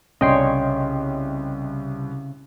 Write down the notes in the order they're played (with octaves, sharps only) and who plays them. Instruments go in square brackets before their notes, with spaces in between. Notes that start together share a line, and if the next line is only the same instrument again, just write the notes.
[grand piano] C2 [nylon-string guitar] C#3 [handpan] C#4 D4 C#5 [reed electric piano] D#5 G5 C6